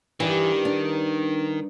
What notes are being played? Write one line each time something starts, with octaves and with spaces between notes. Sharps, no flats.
G2 D#3 E3 D5
D4